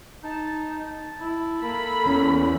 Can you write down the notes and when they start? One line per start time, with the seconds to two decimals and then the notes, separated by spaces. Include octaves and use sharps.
0.24 D#4 A5
1.20 E4
1.62 A#3 A4 B5
2.06 E2 C#4